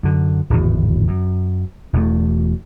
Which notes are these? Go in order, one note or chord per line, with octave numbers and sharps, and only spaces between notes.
F#2 D3
D1 G#1 E2
F#2
E1 E2 B2 A3